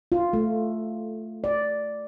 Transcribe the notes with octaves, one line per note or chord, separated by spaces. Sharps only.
F4
A3
D5